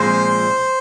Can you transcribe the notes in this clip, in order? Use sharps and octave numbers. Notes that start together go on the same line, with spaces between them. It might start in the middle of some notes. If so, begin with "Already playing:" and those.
Already playing: A#2 F3 G#3 C4 C5